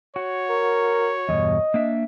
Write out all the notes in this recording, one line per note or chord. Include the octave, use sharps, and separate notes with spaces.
F#4 C#5
A#4
E2 G2 B2 D#5
A#3 D4 E5